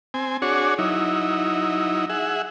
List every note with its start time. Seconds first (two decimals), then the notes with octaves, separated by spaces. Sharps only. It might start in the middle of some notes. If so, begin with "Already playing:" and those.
0.14 C4 G#5
0.42 D4 F#4 G#4 C#5
0.79 F#3 D#4 E4
2.09 G#4 E5 F#5